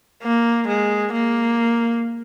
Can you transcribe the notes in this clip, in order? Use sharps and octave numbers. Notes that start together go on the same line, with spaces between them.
A#3
G#3
A#3